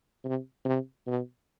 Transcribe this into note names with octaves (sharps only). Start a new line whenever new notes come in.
C3
C3
B2